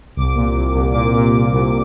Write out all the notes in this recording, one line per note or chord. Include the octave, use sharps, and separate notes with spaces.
C2 D6
A#2
C2
C2
A#2 D6
A#2
A#2
C2